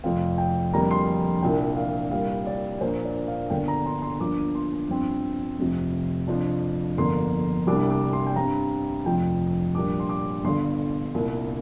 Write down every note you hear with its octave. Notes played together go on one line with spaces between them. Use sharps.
F1 F2 F3 C4 F5
G5
F2 D3 G3 A#3 A#5
C6
C2 A#2 F3 D4 G5
F5
C2 A#2 G3 F5
D5
A#1 A#2 A#3 D4 C5
D5
F5
G1 G2 D3 A#3 D4 G5
A#5
C6
C6
G1 G2 F3 A#3 D4 D6
C6
G2 F3 C4
F1 F2 C3 F3
F1 F2 F3 D4
G1 F2 D3 A#3 D4 C6
C2 C3 G3 A#3 D4 D6
D6
C6
G5
G2 G3 C4 A#5
F1 F2 F3 G5
A#1 A#2 G3 D4 D6
C6
D6
G1 G2 D3 C6
C2 A#2 A#3